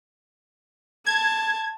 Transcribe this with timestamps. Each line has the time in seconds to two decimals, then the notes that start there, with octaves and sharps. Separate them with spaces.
1.06 A5 G#6